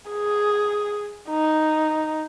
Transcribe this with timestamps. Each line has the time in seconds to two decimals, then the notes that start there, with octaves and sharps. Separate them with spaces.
0.11 G#4
1.29 D#4